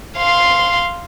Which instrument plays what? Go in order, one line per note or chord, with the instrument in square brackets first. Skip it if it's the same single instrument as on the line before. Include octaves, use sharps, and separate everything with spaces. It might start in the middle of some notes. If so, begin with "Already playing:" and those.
[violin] F5 C6